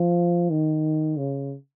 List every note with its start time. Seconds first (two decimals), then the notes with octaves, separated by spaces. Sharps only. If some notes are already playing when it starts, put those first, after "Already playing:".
Already playing: F3
0.50 D#3
1.18 C#3